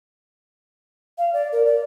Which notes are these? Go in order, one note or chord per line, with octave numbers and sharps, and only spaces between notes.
F5
D5
A#4
D5